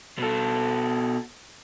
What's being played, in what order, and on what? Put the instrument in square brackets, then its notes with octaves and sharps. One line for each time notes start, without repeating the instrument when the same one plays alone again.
[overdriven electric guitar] B2 A4